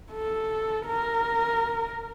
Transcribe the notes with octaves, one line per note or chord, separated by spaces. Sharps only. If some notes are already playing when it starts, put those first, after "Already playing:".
A4
A#4